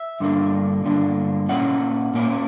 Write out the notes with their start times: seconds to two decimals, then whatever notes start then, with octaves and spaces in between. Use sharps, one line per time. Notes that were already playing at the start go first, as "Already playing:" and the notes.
Already playing: E5
0.20 G2 D3 A#3 D4
0.84 G2 D3 A#3 D4
1.49 A#2 A#3 C#4 E4 F#5
2.14 A#2 A#3 C#4 E4